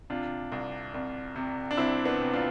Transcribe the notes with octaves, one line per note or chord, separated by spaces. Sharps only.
C3 D4 F4
C2
C2
C3
D4
C2 C4 E4
B3 D4
C3
D4 F4